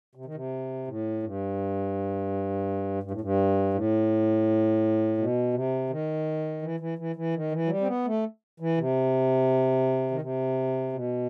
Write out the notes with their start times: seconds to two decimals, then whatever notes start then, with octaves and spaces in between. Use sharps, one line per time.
0.15 C3
0.26 D#3
0.34 C3
0.87 A2
1.23 G2
3.03 G2
3.11 A2
3.21 G2
3.74 A2
5.18 B2
5.54 C3
5.90 D#3
6.62 E3
6.80 E3
6.98 E3
7.16 E3
7.34 D#3
7.51 E3
7.66 F#3
7.69 G3
7.81 C4
7.87 B3
8.06 A3
8.60 E3
8.78 C3
10.11 D#3
10.21 C3
10.93 B2